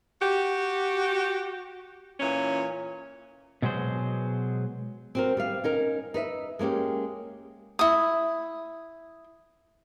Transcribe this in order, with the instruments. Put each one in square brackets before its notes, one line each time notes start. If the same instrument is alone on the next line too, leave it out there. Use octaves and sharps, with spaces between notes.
[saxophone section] F#4 G4
A#2 E3 C#4
[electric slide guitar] B2 F#3 G#3 G#4 C5
[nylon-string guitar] C4 F#4 A#4
G3 B3 F5
C#4 D#4 A#4
D#4 B4 E5
G#3 A#3 C#4 G4
[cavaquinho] E4 D#6